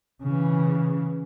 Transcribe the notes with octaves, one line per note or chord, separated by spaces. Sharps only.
C#3 E3